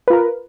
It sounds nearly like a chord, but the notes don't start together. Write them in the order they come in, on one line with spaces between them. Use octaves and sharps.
B4 F4 A#4